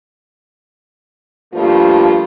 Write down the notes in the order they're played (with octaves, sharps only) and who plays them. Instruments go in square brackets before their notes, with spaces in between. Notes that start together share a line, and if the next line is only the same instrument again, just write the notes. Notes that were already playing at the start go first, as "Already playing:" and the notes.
[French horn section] G2 F3 G3 A3 A#3 F4